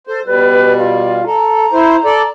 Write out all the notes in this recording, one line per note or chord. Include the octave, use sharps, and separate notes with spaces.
A4 C5
B2 G3 B4
F4
A4 A#5
E4 C5
A4 D5